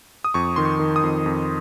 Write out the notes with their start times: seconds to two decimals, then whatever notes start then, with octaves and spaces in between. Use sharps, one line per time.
0.24 D#6
0.34 F2 C#6
0.56 D#3 C6
0.65 C#6
0.80 D#3
0.96 D#6
1.03 F2
1.26 F2